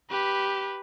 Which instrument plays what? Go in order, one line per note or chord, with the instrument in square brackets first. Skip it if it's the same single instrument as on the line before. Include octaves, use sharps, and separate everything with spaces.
[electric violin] G4 B4